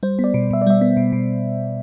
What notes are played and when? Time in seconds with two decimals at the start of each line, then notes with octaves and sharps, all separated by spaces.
0.03 G3 C5
0.19 B3
0.24 D5
0.34 B2
0.51 B2 E5
0.62 D5
0.67 G3 E5
0.81 B3
0.97 B2
1.12 B2